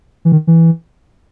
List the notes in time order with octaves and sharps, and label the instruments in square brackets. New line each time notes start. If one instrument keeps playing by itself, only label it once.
[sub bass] E3
D#3
E3